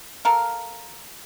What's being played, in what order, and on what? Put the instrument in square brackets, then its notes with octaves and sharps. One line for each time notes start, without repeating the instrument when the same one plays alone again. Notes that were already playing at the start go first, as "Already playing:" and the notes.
[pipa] A4 A#4 F5